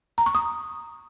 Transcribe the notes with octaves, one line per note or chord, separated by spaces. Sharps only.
A#5
C#6
D#6